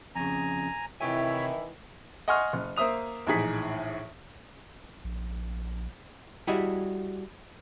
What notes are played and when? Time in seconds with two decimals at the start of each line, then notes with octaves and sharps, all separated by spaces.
0.15 F2 C#3 G#5 A#5
1.01 C3 D#3 E3 E4 G4 C#5 E5 G#5
2.28 D#5 F#5 G#5 C6 C#6 F6
2.53 F#1
2.77 A#3 C5 E5 D#6 F7
3.27 A#1 A2 E3 D#4 G#4 B6
5.04 A#1
6.47 G3 E4 F#4 G#4 D#5